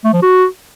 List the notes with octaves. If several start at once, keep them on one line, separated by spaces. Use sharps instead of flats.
A3
F3
F#4